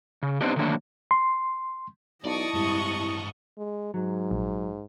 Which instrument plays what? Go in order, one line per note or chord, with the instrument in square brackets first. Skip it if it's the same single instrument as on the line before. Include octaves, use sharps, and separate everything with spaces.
[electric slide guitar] C#3
B3 C4 D4 D#4 G4
D3 D#3 F#3 A3 A#3 D4
[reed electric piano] C6
[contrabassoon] B1 [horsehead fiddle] E4 D#5 [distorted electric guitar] D5 [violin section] A5 C#6 D#6
[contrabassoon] C2 [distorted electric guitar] G2 G#3
[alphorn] G#3
[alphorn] G#2 [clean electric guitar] F#3
[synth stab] A#1